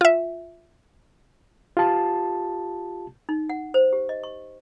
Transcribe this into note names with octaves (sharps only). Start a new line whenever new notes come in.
F4 E5
F4 G4 A5
D#4
F#5
C5
G4
D#5
C#6